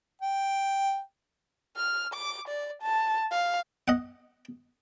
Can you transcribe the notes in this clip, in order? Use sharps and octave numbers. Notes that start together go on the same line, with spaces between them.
G5
F6
D6
D5
A5
F5
D#5 F#5